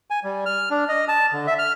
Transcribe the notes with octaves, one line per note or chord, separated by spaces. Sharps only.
G#5
G3
F6
D4
D#5
A5
D3
E5
F6